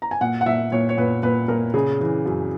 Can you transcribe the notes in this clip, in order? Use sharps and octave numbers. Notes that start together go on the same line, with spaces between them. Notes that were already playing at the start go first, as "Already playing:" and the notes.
A#5
G#5
A#2 F#5
F#5
A#2 E5
A#2 C#5
C#5
A#2 B4
A#2 B4
A#2 A#4
C#3 G#4
E3
F#2